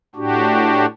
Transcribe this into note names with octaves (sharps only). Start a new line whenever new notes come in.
A2 D4 F#4 G4